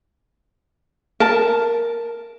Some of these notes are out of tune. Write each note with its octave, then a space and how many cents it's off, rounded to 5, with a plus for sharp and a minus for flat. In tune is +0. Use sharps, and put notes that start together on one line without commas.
A#4 +0 A5 +0